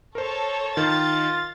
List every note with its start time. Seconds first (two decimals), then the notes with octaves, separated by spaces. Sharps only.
0.15 A4 A#4 C5 C#5
0.77 D#3 F4 A6